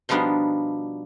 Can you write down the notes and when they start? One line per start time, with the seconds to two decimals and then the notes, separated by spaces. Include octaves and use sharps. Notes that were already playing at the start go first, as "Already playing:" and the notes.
0.09 B2 F3 G3 B3 D4 D#4